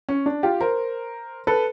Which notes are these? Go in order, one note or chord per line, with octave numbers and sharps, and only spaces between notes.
C#4
D4
F4 G4
A#4 C5
A4 B4